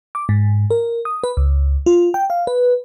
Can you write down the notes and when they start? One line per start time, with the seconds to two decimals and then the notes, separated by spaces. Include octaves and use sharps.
0.15 D6
0.29 G#2
0.71 A#4
1.05 D#6
1.24 B4
1.37 C#2
1.86 F4
2.14 G5
2.30 F5
2.47 B4